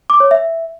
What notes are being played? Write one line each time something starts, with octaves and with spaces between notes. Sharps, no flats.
D6
C#5
E5